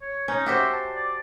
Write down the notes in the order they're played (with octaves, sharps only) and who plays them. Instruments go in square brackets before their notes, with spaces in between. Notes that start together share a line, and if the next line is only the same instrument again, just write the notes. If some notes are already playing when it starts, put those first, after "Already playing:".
[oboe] C#5
[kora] C#4 [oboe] D#4
[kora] F#4 G4 C5 [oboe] E5
[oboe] A5
D5